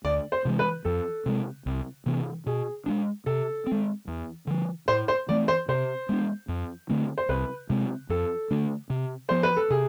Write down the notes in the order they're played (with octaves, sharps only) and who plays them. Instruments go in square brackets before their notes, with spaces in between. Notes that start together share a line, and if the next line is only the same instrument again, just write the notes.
[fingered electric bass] D2 [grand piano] D5
[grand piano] C5
[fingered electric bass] C3 E3 G#3
[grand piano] B4
[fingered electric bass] F2 [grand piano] A4
[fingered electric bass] C3 G#3
C2
C3 E3 B3
[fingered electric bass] B2 [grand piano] G#4
[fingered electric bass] G#3 B3 D4
[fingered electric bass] C3 [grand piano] A4
[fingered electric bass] G#3 C4
E2
D3 F3
[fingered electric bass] A2 [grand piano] C5
[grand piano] C5
[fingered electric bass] E3 A3 C4 [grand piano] D5
[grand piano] C5
[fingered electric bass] C3 [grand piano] C5
[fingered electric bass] G#3 B3 D4
F2
D3 A3 C4
[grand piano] C5
[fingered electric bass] C2 [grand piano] B4
[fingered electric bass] C3 G#3 C4
[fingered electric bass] F2 [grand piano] A4
[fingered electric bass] D3 A3 D4
C3
[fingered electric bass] F3 B3 [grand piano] C5
[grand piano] B4
A4
[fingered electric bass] C3 [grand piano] G#4